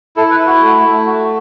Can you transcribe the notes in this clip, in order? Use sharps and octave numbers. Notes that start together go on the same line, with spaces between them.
E4 A4
B4
E4
F#4
A3
A3
F#4